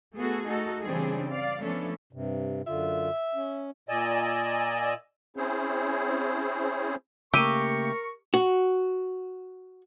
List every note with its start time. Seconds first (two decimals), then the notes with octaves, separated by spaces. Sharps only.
0.15 A3 B3 F#4 G#4 A4
0.48 A3 D#4 F#4 A4
0.83 C#3 E3 G3 C4 D4 G#4
1.30 D5 F5
1.62 F3 A3 B3 C#4 D4 A4
2.13 G2 C3
2.67 F#2 D3 F4 E5
3.35 C#4
3.89 A#2 D5 D#5 G#5 E6
5.37 C4 C#4 E4 G#4 C5 C#5
7.34 C#3 A3 A#3 G4 A#4 C#6 E6 D#7
8.34 F#4